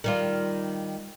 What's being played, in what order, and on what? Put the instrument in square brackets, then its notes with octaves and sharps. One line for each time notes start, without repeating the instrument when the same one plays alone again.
[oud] D#3 G3 F4